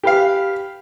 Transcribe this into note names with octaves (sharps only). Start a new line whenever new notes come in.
G4 B4 F5